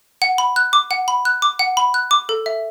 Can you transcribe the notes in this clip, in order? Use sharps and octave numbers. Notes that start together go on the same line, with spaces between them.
F#5
B5
F#6
D6
F#5
B5
F#6
D6
F#5
B5
F#6
D6
A4
E5